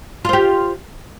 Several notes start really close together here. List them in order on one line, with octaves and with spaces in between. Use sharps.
F4 C5 G4